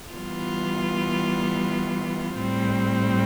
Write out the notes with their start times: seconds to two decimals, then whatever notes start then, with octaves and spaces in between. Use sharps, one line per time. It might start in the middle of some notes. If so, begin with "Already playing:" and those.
0.12 E3 G3 B3 F4
2.37 A2 G3 C4